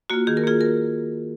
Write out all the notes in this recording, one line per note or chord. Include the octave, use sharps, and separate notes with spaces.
A#3 F4 F#4
D#3 G#4
A#4
A#3 F4 G#4
A#4